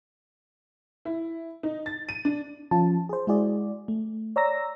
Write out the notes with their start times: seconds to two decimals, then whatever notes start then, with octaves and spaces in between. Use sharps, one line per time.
1.05 E4
1.63 D#4
1.86 A6
2.09 D#7
2.25 D4
2.71 F3 C#4 F4 A5
3.09 G#4 C5
3.27 G#3 E4 F#4 G#4 D5
3.88 A3
4.36 C#5 D5 A#5 E6 A#6